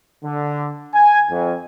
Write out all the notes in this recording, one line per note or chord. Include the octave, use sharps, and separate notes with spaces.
D3
G#5
F2